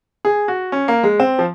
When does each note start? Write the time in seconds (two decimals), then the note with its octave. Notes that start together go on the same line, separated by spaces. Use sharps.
0.25 G#4
0.48 F#4
0.72 C#4
0.88 A#3
1.03 G#3
1.20 C4
1.39 F3